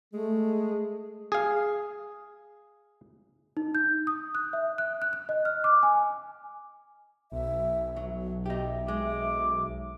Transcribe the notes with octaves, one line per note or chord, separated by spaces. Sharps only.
G#3 A3
G#4 F5
D#4
G6
D#6
F#6
E5
F#6
F#6
F#6
D#5
F6
D6
G#5
B1 E5
F#3
D#4 G4 E5
G#3 D6